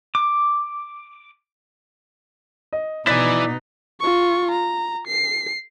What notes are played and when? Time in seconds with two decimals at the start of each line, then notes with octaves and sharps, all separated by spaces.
0.15 D6
2.73 D#5
3.07 B2 D#4 E4 D5 G#5 F#6 A6 B6
4.00 F4 C#6
4.51 A#5
5.07 C7